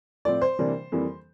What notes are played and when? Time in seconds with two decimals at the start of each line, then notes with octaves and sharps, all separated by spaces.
0.25 A2 F3 C4 D5
0.41 C5
0.59 C3 E3 G3 A#3 D4
0.92 F2 E3 G3 A#3